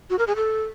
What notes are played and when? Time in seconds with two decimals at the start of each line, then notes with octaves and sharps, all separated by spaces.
0.10 F#4
0.19 A#4
0.27 G#4
0.36 A4